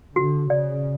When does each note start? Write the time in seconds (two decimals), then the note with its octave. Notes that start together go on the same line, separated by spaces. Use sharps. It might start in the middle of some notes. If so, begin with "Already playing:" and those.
0.16 D3 F#4
0.50 C#3 D5